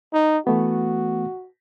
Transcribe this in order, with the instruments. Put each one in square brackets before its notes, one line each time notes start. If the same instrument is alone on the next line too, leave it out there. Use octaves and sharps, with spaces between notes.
[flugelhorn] D#4
[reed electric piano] E3 A3 B3 [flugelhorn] F#4